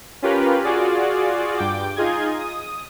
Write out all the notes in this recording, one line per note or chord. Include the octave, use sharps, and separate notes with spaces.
C#4 F4 G4 A#4 B4
F4 F#4 G#4 D5
G2 G5 D6
D#4 F4 G#4 D#5 G#6
D#6